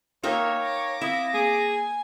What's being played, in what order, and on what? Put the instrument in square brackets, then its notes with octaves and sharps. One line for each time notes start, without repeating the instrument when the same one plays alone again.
[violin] A#3 [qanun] D#4 A#4 E5 [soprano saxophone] C#5 [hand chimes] F5 G5 A#5
[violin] D6 A#6
[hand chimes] C4 F5 D#6 [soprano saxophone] E4 [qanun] E5
[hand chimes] A#3 [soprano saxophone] G#4
[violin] G#5